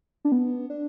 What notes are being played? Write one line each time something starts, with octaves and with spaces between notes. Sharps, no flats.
D4
B3
D4